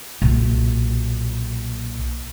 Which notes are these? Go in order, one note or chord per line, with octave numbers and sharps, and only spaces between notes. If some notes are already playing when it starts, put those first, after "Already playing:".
B1 A#2